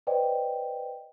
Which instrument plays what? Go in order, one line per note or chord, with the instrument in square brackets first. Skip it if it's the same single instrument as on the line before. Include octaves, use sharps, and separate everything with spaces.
[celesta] B4 C5 D5 D#5 G5